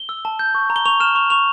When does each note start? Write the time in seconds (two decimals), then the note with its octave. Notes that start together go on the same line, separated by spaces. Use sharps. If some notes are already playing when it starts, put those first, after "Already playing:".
Already playing: G7
0.09 E6
0.25 A5
0.39 G6
0.55 C#6
0.70 A#5
0.76 G7
0.86 C#6 F7
1.00 F6 E7
1.15 C#6 F7
1.30 C#6 F7